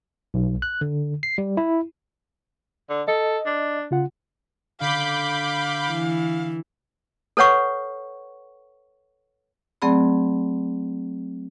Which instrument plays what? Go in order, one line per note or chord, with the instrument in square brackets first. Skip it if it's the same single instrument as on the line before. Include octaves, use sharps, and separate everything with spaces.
[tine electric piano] B1
F#6
D3
C7
G3
E4
[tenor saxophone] D3
[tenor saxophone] A4 [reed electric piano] D#5
[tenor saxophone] D4
[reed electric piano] C#3 F4 F#5
[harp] D3 [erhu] F5 [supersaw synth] B5 D6 G6
[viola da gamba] E3
[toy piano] A4 B4 C#5 F#5 C#6
[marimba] F#3 A3 C4 G#4 D5 B5